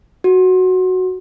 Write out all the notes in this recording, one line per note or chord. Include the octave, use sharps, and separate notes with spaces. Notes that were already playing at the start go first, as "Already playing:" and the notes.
F#4